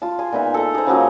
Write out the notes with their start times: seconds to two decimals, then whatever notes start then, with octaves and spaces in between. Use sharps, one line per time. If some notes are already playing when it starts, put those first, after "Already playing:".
0.02 F4 A5
0.19 G#4 C6
0.33 A#2 B3 D#4 E5
0.54 A4 A#5
0.74 G#4 C5
0.87 C#3 F3 F#3 A#3